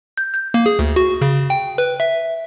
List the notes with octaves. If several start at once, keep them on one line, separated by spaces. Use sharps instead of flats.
G6
G6
A#3
G#4
D2
F#4
C#3
G5
B4
E5